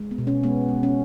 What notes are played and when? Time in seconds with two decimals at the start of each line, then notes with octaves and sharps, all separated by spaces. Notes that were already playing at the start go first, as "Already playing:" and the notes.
Already playing: G#3
0.11 B3
0.18 B2
0.27 C#4
0.43 G#3 B3
0.68 G#3
0.83 C#4